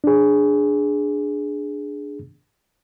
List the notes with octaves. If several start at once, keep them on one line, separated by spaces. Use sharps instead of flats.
D4 G#4